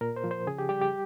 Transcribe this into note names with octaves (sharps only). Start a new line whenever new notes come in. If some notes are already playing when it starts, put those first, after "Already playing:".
A#2 A#4
C5
F3
C5
C#3 G#4
G4
G3 G4
G4